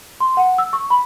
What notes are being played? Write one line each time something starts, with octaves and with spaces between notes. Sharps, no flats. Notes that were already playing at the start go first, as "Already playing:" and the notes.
C6
F#5
E6
C#6
B5